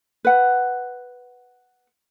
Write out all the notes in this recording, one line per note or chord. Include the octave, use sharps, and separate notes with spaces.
B4 F#5